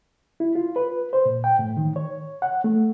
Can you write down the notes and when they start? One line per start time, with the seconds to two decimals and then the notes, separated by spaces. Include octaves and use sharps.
0.40 E4
0.55 F4
0.76 B4
1.13 C5
1.26 A#2
1.44 G5
1.59 A2
1.77 D#3
1.96 C#5
2.42 F#5
2.64 A3